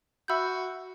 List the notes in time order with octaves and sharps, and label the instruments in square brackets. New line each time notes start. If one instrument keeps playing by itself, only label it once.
[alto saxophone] F#4 [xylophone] E5 B5 E6 G6